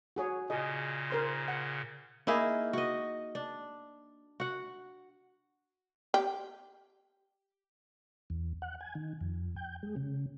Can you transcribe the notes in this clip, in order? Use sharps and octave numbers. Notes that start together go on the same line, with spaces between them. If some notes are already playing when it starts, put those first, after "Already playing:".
F#4 G#4 C#5
A#2 C#3 G#4 D#5
A#4 C5 C6
F#5
A#3 D#4 E4 G#4
F#4 D#5
D4
F#4 F#5
G4
E2
F#5
G#5
D#3
F2
G5
G#3
C#3